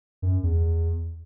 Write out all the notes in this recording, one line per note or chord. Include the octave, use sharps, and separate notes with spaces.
F#2
E2